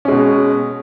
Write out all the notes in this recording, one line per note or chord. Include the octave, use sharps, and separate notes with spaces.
B2 G#3 C#4